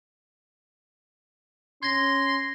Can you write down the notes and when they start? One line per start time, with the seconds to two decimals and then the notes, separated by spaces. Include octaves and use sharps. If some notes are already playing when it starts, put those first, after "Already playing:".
1.83 C#4 C6 G#6 A#6